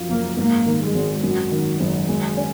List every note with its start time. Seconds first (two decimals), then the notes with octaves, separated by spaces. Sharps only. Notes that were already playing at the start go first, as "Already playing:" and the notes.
Already playing: F#2 F3
0.09 F#1 A#3
0.37 G#2 A#3
0.66 D#3
0.80 G#3
0.94 G#1
1.22 F#2 F#3
1.51 D#3
1.80 F#1
2.09 G#3
2.37 C#4